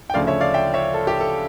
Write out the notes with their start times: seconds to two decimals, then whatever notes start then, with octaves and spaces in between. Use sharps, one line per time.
0.10 G5
0.14 D2 C#3 F3 A3 D5 F5
0.27 C#5 E5
0.41 D5 F5
0.54 E5 G5
0.74 C#5 E5
0.94 A4
1.07 G4
1.20 A4